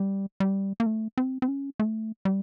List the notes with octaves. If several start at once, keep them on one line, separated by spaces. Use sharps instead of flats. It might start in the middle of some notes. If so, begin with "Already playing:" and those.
Already playing: G3
G3
A#3
A3
C4
C4
C#4
A3
G3